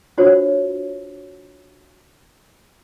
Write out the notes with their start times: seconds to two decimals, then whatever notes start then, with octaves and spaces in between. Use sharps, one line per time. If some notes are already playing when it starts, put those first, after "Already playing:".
0.18 D4 F4 F#4 C5 C#5